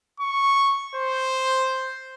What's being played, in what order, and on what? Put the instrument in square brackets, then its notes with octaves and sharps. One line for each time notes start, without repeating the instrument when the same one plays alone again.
[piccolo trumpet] C#6
C5